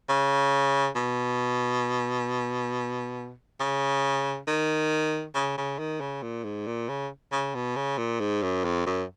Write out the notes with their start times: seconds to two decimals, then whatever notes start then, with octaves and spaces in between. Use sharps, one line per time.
0.09 C#3
0.96 B2
3.60 C#3
4.48 D#3
5.35 C#3
5.58 C#3
5.79 D#3
6.01 C#3
6.23 A#2
6.44 G#2
6.67 A#2
6.89 C#3
7.32 C#3
7.55 B2
7.76 C#3
7.98 A#2
8.20 G#2
8.43 F#2
8.64 F2
8.86 F#2